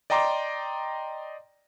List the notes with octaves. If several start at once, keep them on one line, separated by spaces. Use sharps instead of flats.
D5 D#5 G5 A#5 C6 D6